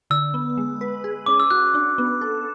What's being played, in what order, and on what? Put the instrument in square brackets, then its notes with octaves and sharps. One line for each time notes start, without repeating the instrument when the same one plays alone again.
[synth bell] D3 [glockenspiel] E6
[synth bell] B3
G#3
B4
G#4
[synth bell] C#4 [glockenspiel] D6
[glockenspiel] E6
[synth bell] F#4 [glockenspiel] F#6
[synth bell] D4
B3
A4